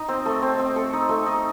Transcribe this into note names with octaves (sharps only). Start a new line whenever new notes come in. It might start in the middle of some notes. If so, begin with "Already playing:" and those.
Already playing: D#4
C4
A3
C4
C4
A4
D#4
A3
D#4